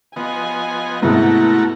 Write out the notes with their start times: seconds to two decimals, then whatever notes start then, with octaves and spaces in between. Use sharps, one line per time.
0.16 F3 B3 D#5 G#5
1.03 G#2 C3 A3 B3 E4 F#4 A#5